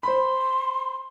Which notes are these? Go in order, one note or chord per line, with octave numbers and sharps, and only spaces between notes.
C5 B5 C6